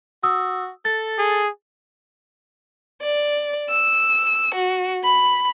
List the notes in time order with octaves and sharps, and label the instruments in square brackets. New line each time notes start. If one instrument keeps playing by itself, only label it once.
[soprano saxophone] F#4 [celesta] D#6 E6
[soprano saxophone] A4 [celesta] A6
[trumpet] G#4
[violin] D5
E6
F#4
B5